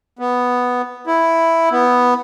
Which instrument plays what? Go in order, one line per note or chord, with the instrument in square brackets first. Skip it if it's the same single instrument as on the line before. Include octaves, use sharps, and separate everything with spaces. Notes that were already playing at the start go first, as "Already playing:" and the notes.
[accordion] B3
E4
B3